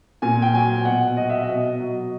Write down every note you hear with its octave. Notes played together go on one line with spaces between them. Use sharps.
A#2 G#5
G5
F#3 G#5
B2 F#5
F#3 D#5
E5
D#5
B2
F#3